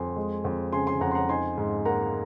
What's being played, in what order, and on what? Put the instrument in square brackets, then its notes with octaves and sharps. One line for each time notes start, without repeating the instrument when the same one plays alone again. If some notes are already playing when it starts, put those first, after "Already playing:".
Already playing: [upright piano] F2 G#5 C6
G#3
F2
C#3 G#5 C6
G#5 C6
F2 F#5 A#5
C6
F#5 A#5
D#4 G#5 C6
G#2
A#3 F#5 A#5